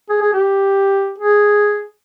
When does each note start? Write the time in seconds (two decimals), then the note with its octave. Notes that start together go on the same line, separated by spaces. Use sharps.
0.10 G#4
0.22 G#4
0.34 G4
1.19 G#4